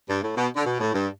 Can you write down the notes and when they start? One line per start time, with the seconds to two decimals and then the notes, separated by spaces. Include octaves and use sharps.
0.08 G2
0.23 A2
0.37 B2
0.56 D3
0.66 B2
0.80 A2
0.94 G2